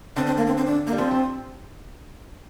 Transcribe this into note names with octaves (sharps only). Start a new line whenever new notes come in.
D3 C4
C4
A#3
C4
C4
D4
A#3
G3
F3 C4
F3